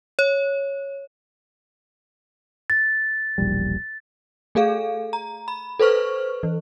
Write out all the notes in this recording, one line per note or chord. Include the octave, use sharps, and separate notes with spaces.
C#5
A6
E1 A#1 G3
A3 G#4 A4 F5
A#5
B5
A4 B4 C5 C#6 F6
E3